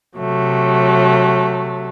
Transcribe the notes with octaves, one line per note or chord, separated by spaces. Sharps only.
C3 F#3 A3